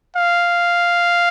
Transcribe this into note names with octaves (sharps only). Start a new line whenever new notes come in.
F5